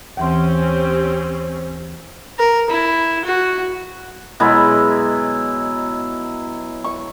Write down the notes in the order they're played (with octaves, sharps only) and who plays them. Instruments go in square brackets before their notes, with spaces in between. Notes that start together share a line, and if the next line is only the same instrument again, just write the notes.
[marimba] D#2 E3 C6 [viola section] C4 C#4 G4
[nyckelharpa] A#4
E4
F#4
[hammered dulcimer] B2 F#3 G#3 E4
C#6